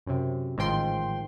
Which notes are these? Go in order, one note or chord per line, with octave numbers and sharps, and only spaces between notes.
F#2 C3
A1 G#2 D#3 F3 G5 C6